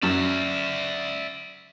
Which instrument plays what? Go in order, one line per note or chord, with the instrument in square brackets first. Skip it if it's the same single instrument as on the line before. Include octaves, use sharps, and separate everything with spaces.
[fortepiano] F#2 F#3 [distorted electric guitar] D5 E5